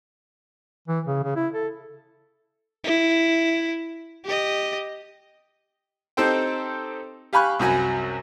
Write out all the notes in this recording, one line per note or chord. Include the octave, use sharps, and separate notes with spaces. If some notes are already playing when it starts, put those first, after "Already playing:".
E3
C#3
C#3
E4
A4
E4
G4 D#5
C4 D#4 G4 A4 C5 G5
G4 F5 G#5 B5 C#6 F#6
C2 F#2 F#4 G#5